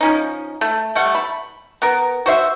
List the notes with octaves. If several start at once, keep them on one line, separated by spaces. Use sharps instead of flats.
F3 C#4 D#4
A3
G3 A3 F#5
B5
B3 A#4
F#4 C5 E5